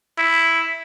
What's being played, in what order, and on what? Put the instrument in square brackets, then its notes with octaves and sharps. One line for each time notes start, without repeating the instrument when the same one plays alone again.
[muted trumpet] E4